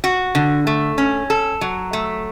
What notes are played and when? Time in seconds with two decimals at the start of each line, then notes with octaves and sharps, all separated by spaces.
0.04 F#4
0.35 D3
0.67 A3
0.98 C#4
1.30 A4
1.61 F#3
1.93 A3